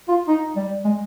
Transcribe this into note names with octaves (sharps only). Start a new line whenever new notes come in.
F4
D#4
G3
G#3